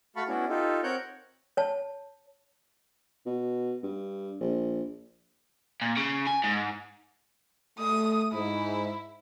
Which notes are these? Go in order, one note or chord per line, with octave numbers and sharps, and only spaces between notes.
A3 F#4 F5 A5 B5 C#6
B3 C#4 D4 E4 F#4
D#4 F4 G4 A4
C4 A#4 C#5 F#5 F#6 G6
C#5 A5
B2
G2
A#1
A#2
C#3
G#5
G#2
A3 D#6
G#2 E4